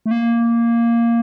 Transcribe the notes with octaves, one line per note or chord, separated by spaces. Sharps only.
A3
A#3